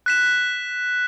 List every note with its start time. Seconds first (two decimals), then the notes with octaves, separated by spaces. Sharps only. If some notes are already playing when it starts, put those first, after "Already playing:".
0.06 F#6 B6 E7